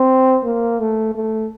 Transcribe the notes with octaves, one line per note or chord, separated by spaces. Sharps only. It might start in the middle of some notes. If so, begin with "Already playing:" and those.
Already playing: C4
A#3
A3
A3